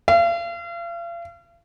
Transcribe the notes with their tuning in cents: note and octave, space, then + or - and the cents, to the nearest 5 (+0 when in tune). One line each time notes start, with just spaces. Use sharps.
F5 -40